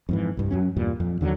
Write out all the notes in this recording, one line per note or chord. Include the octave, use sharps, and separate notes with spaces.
F2 G#2 E3
C2 G2
F#2 F#3 C#4
E2 G2 A#2 G3
F2
D#2 D3 F3 F#3